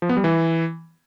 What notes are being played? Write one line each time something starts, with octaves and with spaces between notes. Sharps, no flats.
F3
B3
G3
E3